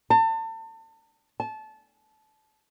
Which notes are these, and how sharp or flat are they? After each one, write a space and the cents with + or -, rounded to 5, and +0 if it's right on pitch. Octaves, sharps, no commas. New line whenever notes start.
A5 +35
A5 -20